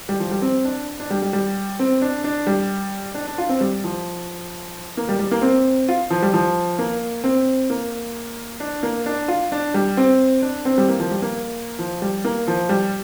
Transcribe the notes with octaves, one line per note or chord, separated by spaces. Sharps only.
G3
F3
G3
C4
D4
D4
G3
G3
G3
C4
D4
D4
G3
D4
D4
F4
C4
G3
F3
A#3
G3
G3
A#3
C4
F4
F3
G3
F3
A#3
C4
A#3
D4
A#3
D4
F4
D4
G3
C4
D4
C4
G3
A#3
F3
G3
A#3
F3
G3
A#3
F3
G3